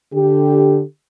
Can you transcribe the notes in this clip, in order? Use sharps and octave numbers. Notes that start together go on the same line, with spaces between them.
D3 G4